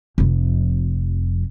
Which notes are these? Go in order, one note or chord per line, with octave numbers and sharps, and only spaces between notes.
F1 F2